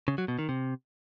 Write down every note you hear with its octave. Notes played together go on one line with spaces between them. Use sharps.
C#3
F#3
B2
D#3
C3